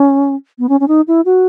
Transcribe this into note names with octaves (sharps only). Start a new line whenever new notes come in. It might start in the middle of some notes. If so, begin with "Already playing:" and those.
Already playing: C#4
B3
C#4
C#4
D#4
E4
F#4